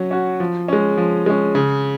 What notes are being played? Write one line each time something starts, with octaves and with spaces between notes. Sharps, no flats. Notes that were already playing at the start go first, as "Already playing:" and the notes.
Already playing: F#3 C#4 F#4
C#4 F#4
F3
G#3 C#4
F3
G#3 C#4
C#3